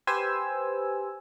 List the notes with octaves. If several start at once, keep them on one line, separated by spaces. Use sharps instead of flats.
G4 B4 C5 G#5 E6